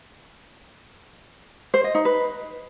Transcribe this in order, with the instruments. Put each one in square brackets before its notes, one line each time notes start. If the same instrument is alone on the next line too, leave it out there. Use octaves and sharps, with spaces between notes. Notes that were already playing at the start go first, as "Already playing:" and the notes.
[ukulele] C5
D#5
D#4
B4